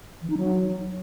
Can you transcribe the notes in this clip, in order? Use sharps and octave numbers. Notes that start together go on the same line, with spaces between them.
E3
D#4
F#3